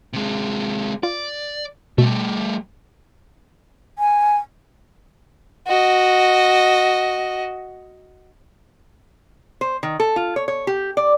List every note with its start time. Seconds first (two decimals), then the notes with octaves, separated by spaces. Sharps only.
0.13 C3 G#3
1.03 F4 D5
1.98 B2 G3 A3
3.99 G#5
5.67 F#4 D#5
9.61 C5
9.83 D#3
10.00 A4
10.16 F4
10.36 C#5
10.48 C#5
10.67 G4
10.97 D5